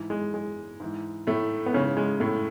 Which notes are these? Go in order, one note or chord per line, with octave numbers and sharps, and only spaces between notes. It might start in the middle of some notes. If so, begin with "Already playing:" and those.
Already playing: G#2 E3
G#3
G#3
G#2 E3
A2 A3
B3
G#2 C#3 E3 C#4
G#3
A2 A3